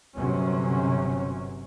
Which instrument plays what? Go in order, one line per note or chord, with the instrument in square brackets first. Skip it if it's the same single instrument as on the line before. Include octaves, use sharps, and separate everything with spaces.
[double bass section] G1 C3 F#3 C#4